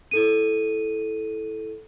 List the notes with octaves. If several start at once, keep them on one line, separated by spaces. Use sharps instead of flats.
E4 A4 D#7